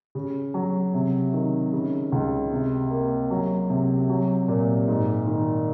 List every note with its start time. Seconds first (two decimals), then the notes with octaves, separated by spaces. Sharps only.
0.15 C#3
0.54 F#3
0.94 C3
1.33 D#3
1.73 C#3
2.12 C#2
2.52 C3
2.90 A#3
3.30 F#3
3.70 C3
4.09 F#3
4.48 A#2
4.88 G#2
5.27 D#3